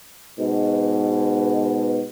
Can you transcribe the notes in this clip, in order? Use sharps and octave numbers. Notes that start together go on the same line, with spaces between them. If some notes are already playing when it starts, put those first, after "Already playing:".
G#2 B2